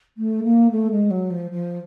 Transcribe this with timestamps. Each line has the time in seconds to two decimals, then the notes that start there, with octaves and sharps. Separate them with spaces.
0.17 A3
0.43 A#3
0.70 A3
0.91 G#3
1.10 F#3
1.30 F3
1.51 F3